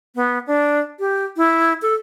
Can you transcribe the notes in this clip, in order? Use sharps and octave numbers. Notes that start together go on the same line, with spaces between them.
B3
D4
G4
E4
A4